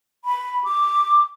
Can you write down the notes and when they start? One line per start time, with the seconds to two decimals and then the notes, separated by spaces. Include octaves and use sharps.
0.25 B5
0.64 D6